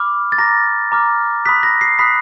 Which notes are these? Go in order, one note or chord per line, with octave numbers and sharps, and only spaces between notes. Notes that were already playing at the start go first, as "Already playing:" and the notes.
Already playing: B5 D6 F6
A6
A#5 D6 F6 A#6
A#5 D6 F6
B5 D#6 F#6 B6
A#6
C7
B5 D#6 F#6 B6